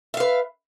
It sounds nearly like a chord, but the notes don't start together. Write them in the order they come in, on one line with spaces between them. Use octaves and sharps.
E5 F5 B4